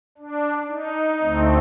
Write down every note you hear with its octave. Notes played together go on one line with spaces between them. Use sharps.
D4
D#4
D2 D3 A3 C4